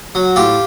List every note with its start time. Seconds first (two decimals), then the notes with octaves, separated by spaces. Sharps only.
0.15 F#3
0.36 A2 F4 G4